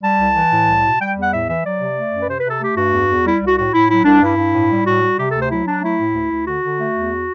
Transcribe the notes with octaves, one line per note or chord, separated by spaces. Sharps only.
G3 A5
C2
E3
A2
C2
B2
G3 G5
E2 F#5
A2 E5
E3 E5
F#3 D5
C3
A3
F#2
B4
C3 C5
C3 B4
A4
A3 G4
G2 F#4
E2
E2
G3 E4
C2 F#4
A2 F#4
A2 E4
F#3 E4
C2 D4
G2 E4
G2
A2
G3
A2 F#4
G3
C3 G4
A4
D2
C5
F#3 E4
F#3 D4
A3 E4
A2
D2
D2
D3 F#4
D3
A3
E2